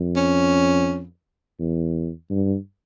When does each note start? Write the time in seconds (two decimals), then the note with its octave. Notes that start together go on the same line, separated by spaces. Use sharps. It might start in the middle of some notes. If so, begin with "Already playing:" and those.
Already playing: F2
0.16 C#4
1.59 E2
2.30 G2